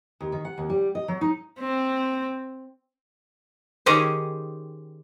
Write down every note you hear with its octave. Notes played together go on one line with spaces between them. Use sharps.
D#2
D#3
F#5
D#2
G3
D#5
F#3
D#4
C4
D#3 C#4 G4 G#4 C5